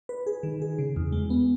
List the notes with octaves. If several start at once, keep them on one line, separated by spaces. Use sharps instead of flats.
B4
G#4
D#3
G#4
C#3
E2
G#3
B3